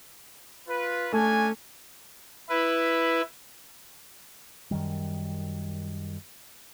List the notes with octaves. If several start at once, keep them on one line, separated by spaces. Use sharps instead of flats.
F4 B4
A3 C#4 D4 G#5
E4 B4
F#2 D#3 G3